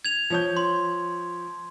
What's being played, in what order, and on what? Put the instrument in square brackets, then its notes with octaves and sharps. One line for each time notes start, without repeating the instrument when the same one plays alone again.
[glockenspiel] G#6 F7
[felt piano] F3 C#5 G6
[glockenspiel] C6